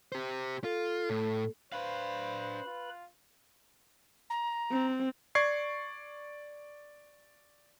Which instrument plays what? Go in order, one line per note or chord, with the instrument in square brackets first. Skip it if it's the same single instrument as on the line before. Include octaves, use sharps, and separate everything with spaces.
[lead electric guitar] G4 C5
[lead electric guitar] F4 [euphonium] A4
[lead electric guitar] A2
[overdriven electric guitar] D4 F5 [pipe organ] B4 B5 [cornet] C5
[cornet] F4
[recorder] A#5
[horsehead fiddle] C4
[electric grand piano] D5 C#6 G#6 C7